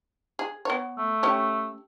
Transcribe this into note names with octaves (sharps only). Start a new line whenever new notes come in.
G#4
B3 C#5
A3
C#4 G4 C#5